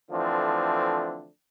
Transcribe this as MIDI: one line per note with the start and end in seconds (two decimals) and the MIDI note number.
0.11 1.27 50
0.11 1.27 52
0.11 1.27 53
0.11 1.27 57
0.11 1.27 60
0.11 1.27 62